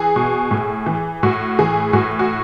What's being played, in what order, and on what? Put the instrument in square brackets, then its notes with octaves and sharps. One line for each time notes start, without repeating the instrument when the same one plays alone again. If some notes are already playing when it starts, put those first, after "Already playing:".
Already playing: [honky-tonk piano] E3 G#4
B2
A2
E3
A2 F#4
E3 G#4
A2 F#4
F#4